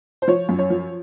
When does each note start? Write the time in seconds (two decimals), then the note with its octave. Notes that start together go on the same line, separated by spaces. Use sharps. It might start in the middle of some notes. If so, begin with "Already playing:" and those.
0.22 C5
0.28 F3 C#5
0.49 F#2
0.59 C#5
0.70 F3